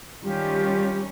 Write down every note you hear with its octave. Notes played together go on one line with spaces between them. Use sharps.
D#3 G3 C#4 F4 G4